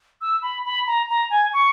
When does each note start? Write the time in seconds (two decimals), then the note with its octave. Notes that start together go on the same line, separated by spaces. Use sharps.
0.21 E6
0.42 B5
0.64 B5
0.87 A#5
1.09 A#5
1.30 G#5
1.53 C#6